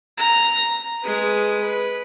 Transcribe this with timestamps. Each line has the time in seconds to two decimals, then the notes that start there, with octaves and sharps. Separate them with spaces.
0.17 A#5
1.00 G#3 B4
1.61 B4